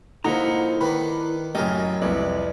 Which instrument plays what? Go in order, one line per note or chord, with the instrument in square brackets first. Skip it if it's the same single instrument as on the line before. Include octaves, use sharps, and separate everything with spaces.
[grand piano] A#2 A#3 D#4 [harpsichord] D3 F3 [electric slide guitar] E4 F#5 A#5
[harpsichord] D#3 D4 [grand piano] B4 B5
[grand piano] F#2 A2 C#3 [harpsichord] G4 A#4 [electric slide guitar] D#5
[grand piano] C2 F2 [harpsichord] E3 [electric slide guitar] D5